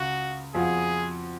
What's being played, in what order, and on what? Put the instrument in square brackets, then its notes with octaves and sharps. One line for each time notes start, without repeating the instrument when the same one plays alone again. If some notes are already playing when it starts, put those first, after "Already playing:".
Already playing: [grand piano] C#2 C#3 [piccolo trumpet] F#4
[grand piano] F2 F3 B3 F#4 [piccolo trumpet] G#4